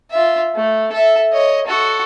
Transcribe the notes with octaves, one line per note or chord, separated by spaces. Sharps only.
F4 E5
A3
A4 E5
C#5 D#5
F#4 A4